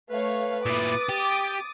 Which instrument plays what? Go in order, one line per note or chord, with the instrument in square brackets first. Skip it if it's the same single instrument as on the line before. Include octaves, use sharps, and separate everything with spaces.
[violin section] A3 C#5 F5 [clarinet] B4
[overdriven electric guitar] A#2 E4 [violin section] D6 D#6 A6
[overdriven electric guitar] G4